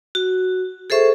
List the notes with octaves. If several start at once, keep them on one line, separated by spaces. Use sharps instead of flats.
F#4
G#4 A4 C5 E5 C#6